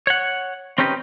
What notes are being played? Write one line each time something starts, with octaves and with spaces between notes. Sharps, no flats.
C#5 F#5
C4 C#4 D#4 G4 A4 B4